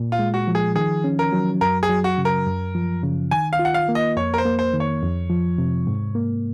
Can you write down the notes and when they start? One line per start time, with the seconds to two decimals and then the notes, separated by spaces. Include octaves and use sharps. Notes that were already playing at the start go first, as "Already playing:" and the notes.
Already playing: A#2
0.12 F4
0.19 G#3
0.34 F#4
0.48 F3
0.55 G#4
0.76 D#3 G#4
1.04 C#4
1.19 A#4
1.33 F#3
1.61 F#2 A#4
1.83 G#4
1.90 F#3
2.04 F#4
2.18 C#3
2.25 A#4
2.46 F#2
2.75 F3
3.03 C#3
3.31 D#3 G#5
3.53 F5
3.59 F4
3.65 F#5
3.74 F5
3.89 A#3
3.95 D#5
4.17 F2 C#5
4.34 A#4
4.38 C5
4.45 A#3
4.59 C5
4.73 D#3
4.80 C#5
5.02 F2
5.30 F3
5.58 C3
5.87 G#2
6.15 A#3